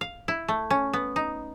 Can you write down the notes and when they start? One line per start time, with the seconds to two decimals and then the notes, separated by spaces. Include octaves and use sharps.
0.01 F5
0.28 E4
0.48 A3
0.70 C#4
0.93 B3
1.16 D#4